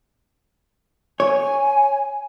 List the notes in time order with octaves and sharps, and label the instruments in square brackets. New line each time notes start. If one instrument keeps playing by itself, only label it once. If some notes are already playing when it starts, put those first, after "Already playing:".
[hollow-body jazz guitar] C#5 [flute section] G#5